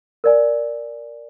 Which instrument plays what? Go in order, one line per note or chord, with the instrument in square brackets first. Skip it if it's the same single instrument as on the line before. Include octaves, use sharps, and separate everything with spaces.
[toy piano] A#4 D5 G#5